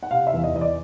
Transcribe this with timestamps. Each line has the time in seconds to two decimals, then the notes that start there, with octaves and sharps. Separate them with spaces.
0.03 F#5
0.11 C3 F5
0.27 E5
0.33 E2
0.44 D#5
0.55 E2 D#5
0.61 D5